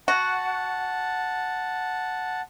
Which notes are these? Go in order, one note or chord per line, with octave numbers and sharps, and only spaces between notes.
F#4 F#5 A5